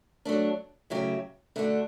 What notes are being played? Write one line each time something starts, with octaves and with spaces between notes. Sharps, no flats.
F#3 A3 D4
C#3 F#3 A3 E4 G4
D3 A3 D4 F#4